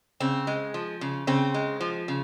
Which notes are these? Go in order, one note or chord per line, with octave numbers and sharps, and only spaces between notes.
C#3 C4
G#3
F3
C#3
C#3 C4
G#3
F3
C#3